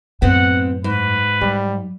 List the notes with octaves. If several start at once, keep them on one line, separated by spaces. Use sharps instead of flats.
F#2 A2 B3 C4 D#4 F#5
G#2 B4
F#3 G3